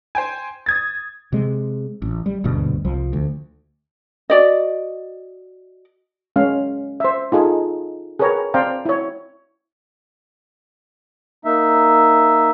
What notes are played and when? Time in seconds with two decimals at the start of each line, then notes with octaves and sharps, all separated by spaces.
0.15 C5 G5 G#5
0.66 D#6 G#6 A6
1.32 C3 G#3
2.02 A1
2.26 G3
2.44 D#1 D2 G2 B2
2.85 C2 F3
3.13 D2
4.30 F#4 D5 D#5
6.36 G#3 C#4 F5
7.00 C5 E5
7.32 D#4 F4 G#4 A4
8.19 G#4 A#4 B4 C#5 G5 A#5
8.54 C4 C5 D5 F5 G5 A#5
8.85 E4 C#5
11.45 A#3 D#4 E5